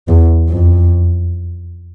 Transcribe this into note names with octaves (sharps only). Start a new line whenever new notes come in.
E2
F2